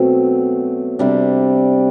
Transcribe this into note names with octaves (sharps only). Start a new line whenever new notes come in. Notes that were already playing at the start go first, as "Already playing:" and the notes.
Already playing: B2 F#3 A3 C4
C3 G3 D4